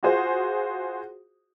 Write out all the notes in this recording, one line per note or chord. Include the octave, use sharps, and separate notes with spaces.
F4 F#4 G#4 C5